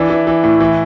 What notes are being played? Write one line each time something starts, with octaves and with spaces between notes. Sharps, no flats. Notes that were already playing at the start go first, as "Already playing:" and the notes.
Already playing: E3 D4
E3
E3
A2
E3